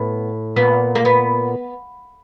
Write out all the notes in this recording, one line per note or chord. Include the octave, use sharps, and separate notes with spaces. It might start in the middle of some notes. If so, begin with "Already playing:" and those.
Already playing: A2 B3
A#2 B3
A#3
B3